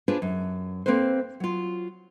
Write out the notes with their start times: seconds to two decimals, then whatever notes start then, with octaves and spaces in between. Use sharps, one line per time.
0.08 D4 F4 G#4 B4 C5 D5
0.22 F#2
0.86 A#3 C4 A4 B4 C5
1.40 F#3 F4